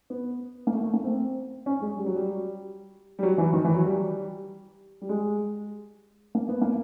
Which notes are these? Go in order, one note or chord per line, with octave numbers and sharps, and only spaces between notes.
B3
A#3
A3
A3
A#3
C4
C#4
G#3
G3
F#3
G3
G3
F#3
E3
D#3
E3
F#3
G3
G3
G#3
A#3
B3
A#3